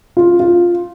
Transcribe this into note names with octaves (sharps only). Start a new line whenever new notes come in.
F4
F4